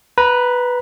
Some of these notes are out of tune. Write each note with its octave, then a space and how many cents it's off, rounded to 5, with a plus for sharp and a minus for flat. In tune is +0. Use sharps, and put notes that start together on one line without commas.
B4 +0 A#5 +25